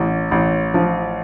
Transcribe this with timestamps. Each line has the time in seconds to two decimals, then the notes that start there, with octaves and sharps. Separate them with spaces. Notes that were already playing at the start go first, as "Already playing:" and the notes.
Already playing: A1
0.31 A1
0.74 F3